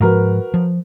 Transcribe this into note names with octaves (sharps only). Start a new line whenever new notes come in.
G#2 F3 F#4 A#4 B4
F3